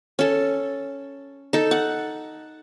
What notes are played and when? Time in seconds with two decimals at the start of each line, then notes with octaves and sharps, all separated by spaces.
0.19 C#4 A4
1.53 D#4 A4
1.71 F#5